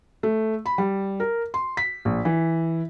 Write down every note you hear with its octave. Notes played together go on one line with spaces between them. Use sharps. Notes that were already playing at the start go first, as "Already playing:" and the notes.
A3
B5
G3
A#4
C6
B6
A#1
E3